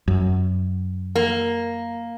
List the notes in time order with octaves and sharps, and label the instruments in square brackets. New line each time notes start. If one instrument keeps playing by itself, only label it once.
[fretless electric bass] F#2
[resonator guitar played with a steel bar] A#3